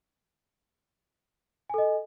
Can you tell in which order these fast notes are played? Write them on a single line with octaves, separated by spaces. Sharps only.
G#5 A4 D#5